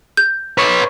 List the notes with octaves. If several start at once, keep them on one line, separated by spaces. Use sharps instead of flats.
G6
B4 C#5